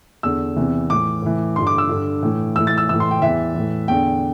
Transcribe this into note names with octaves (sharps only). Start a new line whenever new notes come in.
E2 D3 E6
E2 C3 E3
A2 E3 D6
A2 E3
G2 D3 C6
D6
E6
G2 D3
A2 E3
A2 E3 E6
A6
E6
A2 E3 E6
C6
G5
E2 E3 E5
A2 E3
E2 D3 G5